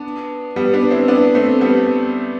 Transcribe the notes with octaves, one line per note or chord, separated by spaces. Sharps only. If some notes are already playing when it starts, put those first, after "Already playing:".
Already playing: B3 D4
G3 B3
B3 D4
C4 E4
B3 D4
A3 C4
G3 B3